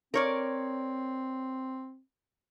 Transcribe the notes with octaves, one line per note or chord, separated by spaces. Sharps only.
C4 A#4 C#5 D5